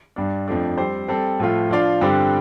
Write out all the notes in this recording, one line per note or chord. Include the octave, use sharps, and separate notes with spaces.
G2 G3 D4
F2 F3 A3 D4
G3 C4 G4 C5
G3 C4 A4
A2 F3 A3 F4
F3 D4 F4 D5 F5
G2 D3 G3 C4 G4